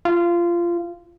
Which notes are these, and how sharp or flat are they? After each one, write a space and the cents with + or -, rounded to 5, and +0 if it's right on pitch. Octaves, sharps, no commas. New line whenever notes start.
F4 -20